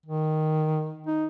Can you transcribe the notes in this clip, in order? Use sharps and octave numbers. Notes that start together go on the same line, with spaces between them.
D#3
D#4